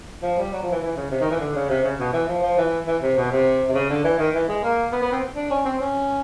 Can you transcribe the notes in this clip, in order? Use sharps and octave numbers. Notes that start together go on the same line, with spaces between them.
F3
G3
F#3
F3
E3
E3
C#3
C3
D#3
E3
D3
C#3
C3
C#3
B2
E3
F3
F3
E3
E3
C3
B2
C3
C3
C#3
D3
E3
D#3
E3
G#3
A#3
B3
B3
C4
D4
C#4
C4
C#4